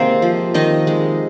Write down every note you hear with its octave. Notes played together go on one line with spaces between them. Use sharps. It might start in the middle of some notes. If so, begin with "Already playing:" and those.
Already playing: C3 D#3 G#3 A#3 C4 G#4 A#4 C5
F3
D#3 D#4 D#5
G#3